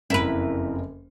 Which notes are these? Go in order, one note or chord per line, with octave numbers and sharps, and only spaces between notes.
F#1 F2 E4 A#4 B4